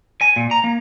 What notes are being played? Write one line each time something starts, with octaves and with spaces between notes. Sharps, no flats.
G#5
A#2
A#5
A#3